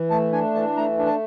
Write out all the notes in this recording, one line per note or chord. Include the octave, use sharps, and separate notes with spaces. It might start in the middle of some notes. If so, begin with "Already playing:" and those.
Already playing: E3
A3 A5
D4 G#5
E3 A5
A3 A#5
D4
A5